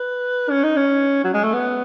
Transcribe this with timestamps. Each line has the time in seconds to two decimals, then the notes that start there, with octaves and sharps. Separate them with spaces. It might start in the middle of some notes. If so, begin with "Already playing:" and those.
Already playing: B4
0.50 C#4
0.63 D#4
0.77 C#4
1.24 F#3
1.34 G#3
1.44 A3
1.53 B3